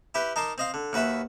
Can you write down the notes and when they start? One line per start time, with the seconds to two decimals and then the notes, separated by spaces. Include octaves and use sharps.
0.14 E4 G4 B4 G5
0.36 D#4 A#4 A5 C6 D6
0.58 C4 D#5 F5
0.74 D3
0.93 D#2 F#4 B4 E5 B5